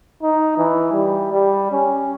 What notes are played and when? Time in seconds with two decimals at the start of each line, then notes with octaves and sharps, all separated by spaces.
0.23 D#4
0.58 E3
0.93 G3
1.33 G3
1.72 C#4